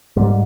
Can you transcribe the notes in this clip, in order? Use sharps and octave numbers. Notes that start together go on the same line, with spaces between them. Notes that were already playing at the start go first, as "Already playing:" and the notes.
G#2 G3